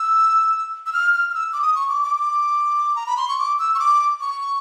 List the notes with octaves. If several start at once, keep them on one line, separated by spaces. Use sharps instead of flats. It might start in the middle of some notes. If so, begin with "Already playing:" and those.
Already playing: E6
E6
F6
F6
F6
E6
D6
D#6
C#6
D6
D6
D6
A#5
B5
C6
C#6
D6
E6
C#6
D6
C#6